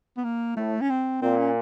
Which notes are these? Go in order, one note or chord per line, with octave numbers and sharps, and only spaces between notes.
B3
A#3
A2 A3
C#4
C4
A#2 C4
C#4